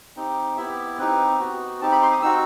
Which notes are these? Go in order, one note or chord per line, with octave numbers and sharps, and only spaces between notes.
C4 D#4 G4
B3 E4 G4 E5
C4 D#4 G4 B4
B3 F#4
C4 D#4 G4 A5
B5
C6
D#6
C4 D#4 F#4 E6